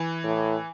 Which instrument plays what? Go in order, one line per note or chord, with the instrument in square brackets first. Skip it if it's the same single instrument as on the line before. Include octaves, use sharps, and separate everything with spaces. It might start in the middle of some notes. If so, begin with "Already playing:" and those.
Already playing: [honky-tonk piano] E3
[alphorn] A2